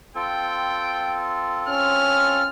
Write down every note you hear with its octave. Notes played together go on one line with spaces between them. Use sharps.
C4 F4 A4 G5
C#4 F6